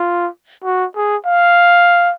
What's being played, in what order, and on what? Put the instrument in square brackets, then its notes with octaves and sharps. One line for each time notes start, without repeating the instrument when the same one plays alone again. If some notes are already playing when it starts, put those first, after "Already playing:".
Already playing: [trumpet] F4
F#4
G#4
F5